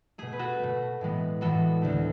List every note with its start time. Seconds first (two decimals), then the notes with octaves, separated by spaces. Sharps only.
0.18 B2 A3 G#4
0.33 B4
0.39 F#4 A4
0.59 B2 A3
1.01 A2 E3 G#3 B3
1.41 A2 E3 G#3 B3 F#4 A4
1.82 D2 D3 A3